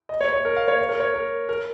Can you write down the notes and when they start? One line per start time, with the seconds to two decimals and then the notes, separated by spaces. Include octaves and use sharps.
0.09 D#5
0.21 C#5
0.33 C#5
0.45 A#4
0.56 F5
0.68 C#5
0.79 C#5
0.89 A#4
1.00 C#5
1.14 A#4
1.49 A#4